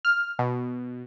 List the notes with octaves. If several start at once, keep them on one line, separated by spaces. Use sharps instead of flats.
F6
B2